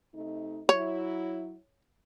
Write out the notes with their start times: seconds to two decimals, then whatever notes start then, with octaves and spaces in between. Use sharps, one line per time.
0.14 C3 A3 D#4
0.69 F#3 E4 C#5